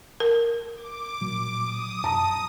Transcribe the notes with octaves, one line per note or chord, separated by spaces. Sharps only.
A#4
D6
A#2 F#3
D#6
F#2 A5 A#5